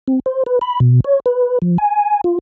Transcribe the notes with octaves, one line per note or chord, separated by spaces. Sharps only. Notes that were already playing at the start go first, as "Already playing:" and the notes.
C4
C5
B4
B5
B2
C#5
B4
F3
G#5
F4